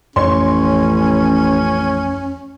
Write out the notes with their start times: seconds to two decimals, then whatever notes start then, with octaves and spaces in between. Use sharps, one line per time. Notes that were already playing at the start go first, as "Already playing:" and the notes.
0.16 A1 F2 A3 C#4 C#5 C6